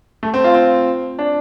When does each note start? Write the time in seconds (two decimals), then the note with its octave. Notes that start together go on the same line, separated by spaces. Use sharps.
0.23 A3
0.34 C4
0.44 F4
0.54 C4
1.19 D4